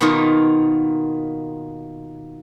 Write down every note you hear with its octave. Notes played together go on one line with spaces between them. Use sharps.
B2 D#3 A#3 B3 D#4 F4